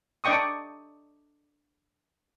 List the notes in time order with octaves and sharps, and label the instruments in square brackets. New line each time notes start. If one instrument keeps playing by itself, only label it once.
[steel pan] D4 D5 D#5 G5 C#6 D#6